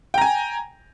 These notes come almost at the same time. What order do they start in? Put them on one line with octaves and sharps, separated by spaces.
G5 A#5 G#5